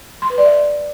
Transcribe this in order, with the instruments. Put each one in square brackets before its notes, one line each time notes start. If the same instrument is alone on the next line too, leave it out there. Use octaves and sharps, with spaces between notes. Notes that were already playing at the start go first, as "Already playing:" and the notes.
[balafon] C6
B4
D5
E5